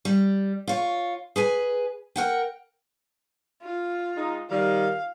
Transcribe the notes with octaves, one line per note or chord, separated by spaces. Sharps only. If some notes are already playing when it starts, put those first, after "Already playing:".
G3
F4 C#5
G#4 B4 G#5
A#4 F#5 G5
F4
G#3 D#4
D#3 G3 F5